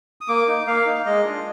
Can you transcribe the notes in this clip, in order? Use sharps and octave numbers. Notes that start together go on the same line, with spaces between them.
D#6
A#3 D6
D#4
A#3 F5
D#4
G#3 D#5
D4 F4